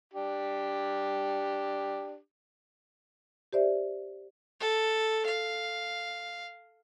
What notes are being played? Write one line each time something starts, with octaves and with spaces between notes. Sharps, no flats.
D4 G4
G4 C5 D5 E5
A4
F5